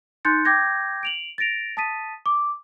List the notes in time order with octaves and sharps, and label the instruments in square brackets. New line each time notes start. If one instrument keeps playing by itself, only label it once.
[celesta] D#4 C6 F#6 G6 A6 C#7
G5 D6 G6 G#6 A#6
D7 F7 F#7
A6 A#6 D7 F7
A5 D#6 A6 B6 D#7
D6